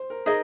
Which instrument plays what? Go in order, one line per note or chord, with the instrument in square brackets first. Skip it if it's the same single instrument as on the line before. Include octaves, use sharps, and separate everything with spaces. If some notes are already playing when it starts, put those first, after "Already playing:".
Already playing: [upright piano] C5
A#4
[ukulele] D#4 G#4 D#5 [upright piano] A#4